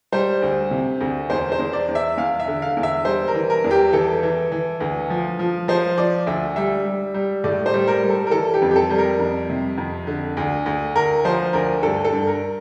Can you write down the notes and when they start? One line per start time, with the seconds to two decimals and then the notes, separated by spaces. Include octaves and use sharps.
0.12 G3 C5
0.42 D2
0.71 C3
1.01 D2
1.30 E2 C5
1.52 C5
1.59 E2
1.73 D5
1.89 E2
1.95 E5
2.18 E2 F5
2.39 E5
2.47 D3
2.62 F5
2.77 E2
2.83 E5
3.05 G3 C5
3.28 A#4
3.34 E3
3.50 A#4
3.64 E2
3.71 G4
3.93 E3 A4
4.23 E3
4.52 E3
4.80 D2
5.10 F3
5.39 F3
5.68 F3 C5
5.98 F3 D5
6.27 D2 E5
6.56 G3 E5
6.85 G3
7.14 G3
7.44 A2 D5
7.66 C5
7.74 G3
7.87 A#4
8.03 G3
8.10 A4
8.27 A#4
8.31 E3 A4
8.54 G4
8.62 F2
8.71 G4
8.76 A4
8.90 G3
8.98 A#4
9.19 F2
9.49 C3
9.78 F2
10.07 D3
10.37 D2
10.66 D2
10.95 D2 A#4
11.25 F3 C5
11.53 D2 A#4
11.83 G2 A4
12.04 A4
12.12 G2
12.27 A#4